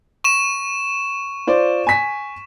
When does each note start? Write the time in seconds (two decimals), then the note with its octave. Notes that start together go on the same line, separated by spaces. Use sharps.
0.24 C#6 E7
1.47 F4 C5 D5
1.87 G#5 B6